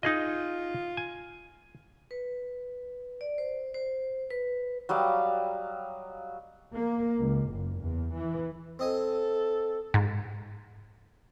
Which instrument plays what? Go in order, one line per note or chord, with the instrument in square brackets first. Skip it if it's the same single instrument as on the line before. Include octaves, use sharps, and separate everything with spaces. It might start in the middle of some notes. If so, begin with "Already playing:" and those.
[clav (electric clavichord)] D#4 G#4 D#5 [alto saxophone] F4
[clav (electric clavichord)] G#5
[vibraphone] B4
D5
C5
C5
B4
[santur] F#3 G3 D#5 F5
[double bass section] A#3
C#2
F#1
E2
E3
[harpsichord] C4 D#5 G#5 [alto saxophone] A4
[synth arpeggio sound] G#2